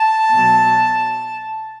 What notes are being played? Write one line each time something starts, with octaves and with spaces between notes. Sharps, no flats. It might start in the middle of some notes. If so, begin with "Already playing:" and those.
Already playing: A5
B2 F#3